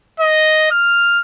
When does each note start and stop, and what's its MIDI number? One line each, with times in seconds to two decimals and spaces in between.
0.20 0.68 75
0.71 1.22 89